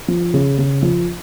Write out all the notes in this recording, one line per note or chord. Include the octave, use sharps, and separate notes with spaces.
F3
C#3
C#3
F3